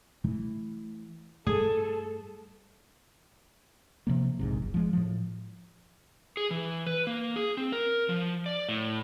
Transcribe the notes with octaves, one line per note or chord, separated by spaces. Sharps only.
E3 A3
G2 G3 A3 E4 G#4 A4
C3 F3 A#3
A#1 G#2 C3
F#1
F3 G#3
A2 F3
G#4
E3
B4
A#3
G#4
C4
A#4
F3
D5
A2